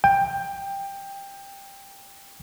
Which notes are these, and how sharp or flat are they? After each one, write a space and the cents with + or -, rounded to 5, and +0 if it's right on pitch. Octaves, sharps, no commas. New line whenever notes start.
G5 +15